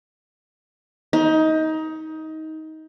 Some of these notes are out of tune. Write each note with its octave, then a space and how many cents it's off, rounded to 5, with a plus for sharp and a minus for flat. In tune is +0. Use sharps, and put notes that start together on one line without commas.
D#4 +20